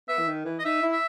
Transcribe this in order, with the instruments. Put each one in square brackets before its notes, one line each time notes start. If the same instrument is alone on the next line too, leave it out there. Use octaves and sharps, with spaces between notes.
[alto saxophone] B3 [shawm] E5
[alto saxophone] E3
D#3
E3
[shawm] D#5
[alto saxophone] D#4 [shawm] E5
[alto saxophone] E4
[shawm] E5